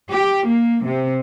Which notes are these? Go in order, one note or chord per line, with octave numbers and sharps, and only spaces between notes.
G4
A#3
C3